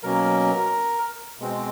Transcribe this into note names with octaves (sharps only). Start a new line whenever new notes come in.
B2 F#3 A#3 C#4 A#4
B2 G#3 C4